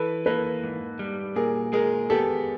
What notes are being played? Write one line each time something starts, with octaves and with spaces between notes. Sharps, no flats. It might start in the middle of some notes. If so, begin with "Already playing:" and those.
Already playing: E3 A4 B4
A#3 A4 B4
G#2
G3
A#2 G#4 A#4
G#3 G#4 A#4
B3 G4 A4